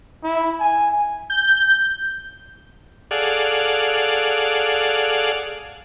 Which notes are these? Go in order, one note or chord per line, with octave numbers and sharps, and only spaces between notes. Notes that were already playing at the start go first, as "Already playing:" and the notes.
E4
G#5
G6
G#4 A4 D5 F5 F#5